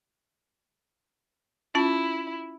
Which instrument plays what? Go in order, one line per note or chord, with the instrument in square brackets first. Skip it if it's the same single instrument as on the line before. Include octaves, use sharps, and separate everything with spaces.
[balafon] C#4 F4 A5 [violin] E4